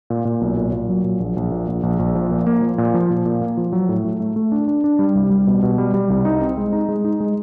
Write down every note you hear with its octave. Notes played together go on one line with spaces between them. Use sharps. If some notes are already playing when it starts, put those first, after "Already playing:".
A#2
A#2
B1
A#2
A#2
F#3
A#2
A#1
A#1
A#2
A#1
A#1
A#1
F3
A#2
A#3
F3
A#2
F3
A#2
A#2
A#3
F3
F#3
A2
A3
A3
A3
D4
D4
D4
G3
C2
G3
B2
B2
G3
G3
C2
D#4
C4
G#3
D#4
G#3
D#4
G#3